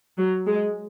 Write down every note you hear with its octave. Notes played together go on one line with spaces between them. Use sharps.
F#3
G#3